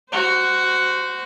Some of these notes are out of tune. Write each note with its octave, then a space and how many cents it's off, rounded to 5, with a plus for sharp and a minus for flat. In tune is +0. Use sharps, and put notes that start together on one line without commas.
F#4 +5 C5 -20